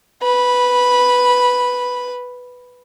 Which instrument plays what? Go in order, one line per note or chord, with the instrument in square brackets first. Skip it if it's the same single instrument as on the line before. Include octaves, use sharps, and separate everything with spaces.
[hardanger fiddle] B4 B5